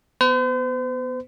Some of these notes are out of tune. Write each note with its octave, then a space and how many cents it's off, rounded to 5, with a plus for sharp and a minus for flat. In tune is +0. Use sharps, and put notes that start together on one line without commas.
B3 +0 C5 -45